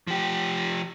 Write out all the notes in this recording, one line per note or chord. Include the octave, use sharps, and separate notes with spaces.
F3 G4